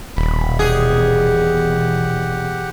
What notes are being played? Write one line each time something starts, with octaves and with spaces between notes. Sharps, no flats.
D#1 B2 E3 B5
G4 G#4 F#5